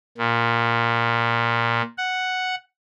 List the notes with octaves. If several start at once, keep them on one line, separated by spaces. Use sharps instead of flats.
A#2
F#5